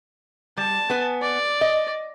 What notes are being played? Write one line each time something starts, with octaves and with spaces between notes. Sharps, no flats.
G3 A5
B3 B4 G#5
D5
D#5